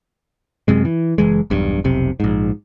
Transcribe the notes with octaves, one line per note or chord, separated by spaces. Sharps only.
F#2 C3 G#3
E3
F#1 E3 G#3
E1 B1 G2
F1 B1 C3
A#1 G#2